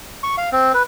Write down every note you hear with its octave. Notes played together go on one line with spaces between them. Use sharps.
C#6
F5
C4
B4